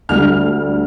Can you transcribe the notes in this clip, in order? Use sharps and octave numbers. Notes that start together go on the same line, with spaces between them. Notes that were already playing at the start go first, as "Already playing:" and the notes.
D2 D3 G3 F6